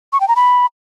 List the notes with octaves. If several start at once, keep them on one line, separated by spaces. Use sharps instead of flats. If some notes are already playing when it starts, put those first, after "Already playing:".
C#6
G5
A#5
B5